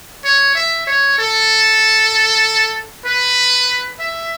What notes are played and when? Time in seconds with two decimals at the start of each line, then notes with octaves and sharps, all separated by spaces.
0.25 C#5
0.56 E5
0.87 C#5
1.18 A4
3.05 B4
4.00 E5